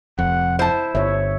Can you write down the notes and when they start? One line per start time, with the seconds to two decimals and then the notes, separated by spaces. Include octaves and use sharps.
0.19 F1 F2 F#5
0.59 E4 C5 A5
0.95 G1 C#5 E5